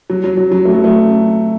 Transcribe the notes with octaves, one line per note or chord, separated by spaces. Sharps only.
F#3
F#3
F#3
F#3
A3
F#3
A3